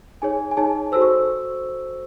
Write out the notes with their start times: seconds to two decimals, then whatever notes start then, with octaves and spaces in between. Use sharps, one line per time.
0.22 D#4 G#4 C#5 G#5
0.51 G#5
0.57 D#4 G#4 C#5 A5
0.92 F#4 A4 C5 E6
1.02 C#6